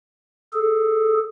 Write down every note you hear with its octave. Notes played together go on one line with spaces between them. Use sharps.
G#4 A4